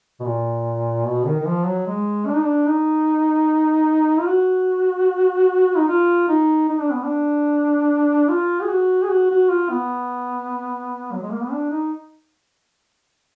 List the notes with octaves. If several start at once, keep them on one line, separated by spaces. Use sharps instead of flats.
B2
A#2
B2
D#3
D#3
F3
F#3
G#3
D4
D#4
D4
D#4
F4
F#4
D#4
F4
D#4
D#4
D4
B3
D4
F4
G#4
F#4
G#4
F#4
F#4
F4
B3
F#3
G#3
A#3
B3
D4
D#4